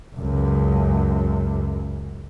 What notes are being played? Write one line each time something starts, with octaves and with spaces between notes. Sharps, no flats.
C#2 F#2